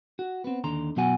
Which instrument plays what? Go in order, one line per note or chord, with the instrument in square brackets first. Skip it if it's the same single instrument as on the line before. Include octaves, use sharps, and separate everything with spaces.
[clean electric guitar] F#4
B3 C4
D#2 D3 A#5 C6
B2 F#3 B3 F#4 F#5 G#5